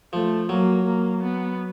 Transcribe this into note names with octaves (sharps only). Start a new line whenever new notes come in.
F3 A3
F#3 A#3
A#3
B3